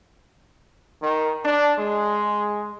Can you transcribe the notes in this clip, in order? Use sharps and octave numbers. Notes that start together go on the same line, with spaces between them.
D#3
D4
G#3